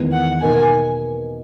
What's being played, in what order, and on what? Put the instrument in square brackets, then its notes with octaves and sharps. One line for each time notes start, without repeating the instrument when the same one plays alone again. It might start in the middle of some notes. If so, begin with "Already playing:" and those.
Already playing: [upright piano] E2 D#3 G#3 B3
[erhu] F#5
[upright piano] B2 A#3 D#4 A#4 [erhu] G#5